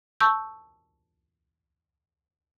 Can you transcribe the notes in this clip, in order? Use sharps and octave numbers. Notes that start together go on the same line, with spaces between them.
A5 C#6 E6 G6